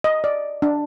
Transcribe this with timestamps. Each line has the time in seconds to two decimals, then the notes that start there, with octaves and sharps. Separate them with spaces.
0.04 D#5
0.24 D5
0.62 D4